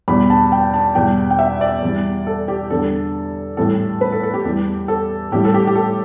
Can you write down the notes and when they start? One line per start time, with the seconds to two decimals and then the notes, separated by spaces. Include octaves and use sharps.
0.08 E2 B2 G3 B5
0.30 A5
0.52 G5
0.74 A5
0.95 E2 B2 G3 G5
1.30 G5
1.39 E5
1.61 D5
1.82 E2 E3 G3
2.27 A4
2.48 G4
2.70 E2 D3 G3 A4
3.57 A2 E3 G3 A4
4.01 B4
4.12 A4
4.23 A4
4.34 G4
4.45 E2 E3 G3
4.88 A4
5.32 A2 E3 G3 G4
5.45 A4
5.54 G4
5.67 G4
5.75 A4